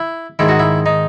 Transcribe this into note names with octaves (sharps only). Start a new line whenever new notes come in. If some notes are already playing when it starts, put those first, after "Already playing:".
Already playing: E4
G#2 D#3 E4
F#4
E4
D#4